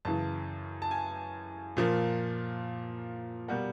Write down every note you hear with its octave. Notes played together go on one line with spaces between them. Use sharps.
F#2 C#3 E3 A5
A5
G#5
A#2 F3 A#3
B2 G3 A#3 F#5